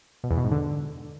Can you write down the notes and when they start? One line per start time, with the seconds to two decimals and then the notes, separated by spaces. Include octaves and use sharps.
0.24 B2
0.31 E2
0.37 B2
0.44 G#2
0.51 D3